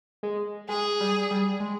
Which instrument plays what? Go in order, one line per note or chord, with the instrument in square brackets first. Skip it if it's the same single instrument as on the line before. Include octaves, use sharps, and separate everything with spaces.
[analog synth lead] G#3
[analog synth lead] G#3 [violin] G#4
[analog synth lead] G3
G3
G#3